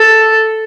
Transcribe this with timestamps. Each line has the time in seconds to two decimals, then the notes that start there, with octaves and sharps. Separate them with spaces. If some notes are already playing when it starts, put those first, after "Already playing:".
Already playing: A4